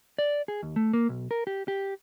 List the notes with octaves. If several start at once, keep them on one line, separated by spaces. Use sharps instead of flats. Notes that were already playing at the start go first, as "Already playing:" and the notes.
D5
G#4
D#2
A3
A#3
B1
A#4
G4
G4